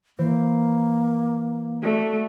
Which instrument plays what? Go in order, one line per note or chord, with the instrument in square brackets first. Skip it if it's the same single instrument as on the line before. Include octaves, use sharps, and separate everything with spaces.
[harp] E3 C5 [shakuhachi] A#3
[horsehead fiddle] A3 [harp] F#4 D5